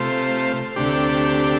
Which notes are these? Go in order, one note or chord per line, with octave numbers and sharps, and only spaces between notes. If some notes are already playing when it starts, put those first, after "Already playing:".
Already playing: C3 A3 F4 C5
D2 C3 A3 D4 G4